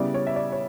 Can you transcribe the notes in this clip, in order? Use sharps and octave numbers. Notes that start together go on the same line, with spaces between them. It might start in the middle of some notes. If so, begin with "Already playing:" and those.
Already playing: C#3 G3 B3 E4 D5
C#5
E5
D5
C#5